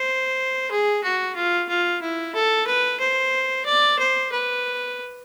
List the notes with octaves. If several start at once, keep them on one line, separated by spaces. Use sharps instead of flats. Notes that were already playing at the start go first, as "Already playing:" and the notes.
Already playing: C5
G#4
F#4
F4
F4
E4
A4
B4
C5
D5
C5
B4